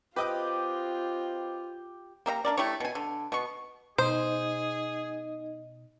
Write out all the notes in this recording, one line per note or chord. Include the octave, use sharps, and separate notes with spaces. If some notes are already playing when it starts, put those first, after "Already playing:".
C4 F4 G4 B4 D#5 D6
A#3 G4 E5 A#5
D4 E4 A#4 D5
A3 E4 G4 C#5
B2 G#5
D3
B2 B3 C#6
B2 D#4 G#4 C5 D#5